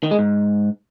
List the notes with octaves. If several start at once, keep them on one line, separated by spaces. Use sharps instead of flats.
D#3
G#3
G#2